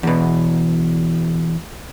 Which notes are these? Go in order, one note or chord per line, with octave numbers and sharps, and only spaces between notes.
E2 B2